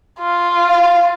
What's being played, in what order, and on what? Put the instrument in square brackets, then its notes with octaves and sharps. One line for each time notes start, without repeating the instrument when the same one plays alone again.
[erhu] F4
[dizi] F5